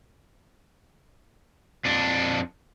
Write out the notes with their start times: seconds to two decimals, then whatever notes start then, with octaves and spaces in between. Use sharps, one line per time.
1.85 F2 D4